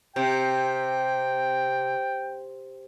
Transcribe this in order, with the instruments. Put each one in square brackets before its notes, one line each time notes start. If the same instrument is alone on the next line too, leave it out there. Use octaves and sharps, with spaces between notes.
[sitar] C3 [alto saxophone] G5